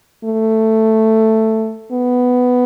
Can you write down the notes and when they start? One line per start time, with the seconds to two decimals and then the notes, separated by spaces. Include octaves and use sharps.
0.25 A3
1.92 B3